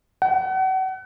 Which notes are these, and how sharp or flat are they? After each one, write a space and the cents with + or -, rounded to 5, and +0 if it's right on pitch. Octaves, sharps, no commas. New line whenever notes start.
F#5 +35